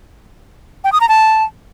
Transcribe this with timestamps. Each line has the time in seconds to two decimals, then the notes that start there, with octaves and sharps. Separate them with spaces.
0.84 G5
0.92 D#6
1.01 A#5
1.09 A5